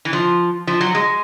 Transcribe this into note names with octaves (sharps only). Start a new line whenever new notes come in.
E3
F3
F3
F#3
G#3